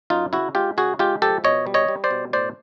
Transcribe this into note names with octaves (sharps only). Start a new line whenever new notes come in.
F#2 D#4 F4
C#3 E4 F#4
G#3 F4 G4
C#3 F#4 G#4
G#3 F4 G4
F3 G4 A4
B2 C#5 D#5
G3
C#5 D#5
G3
C5 D5
B2
A2 C5 D5